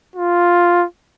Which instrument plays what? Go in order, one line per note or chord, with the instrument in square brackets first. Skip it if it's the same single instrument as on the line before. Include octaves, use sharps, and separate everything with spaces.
[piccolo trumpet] F4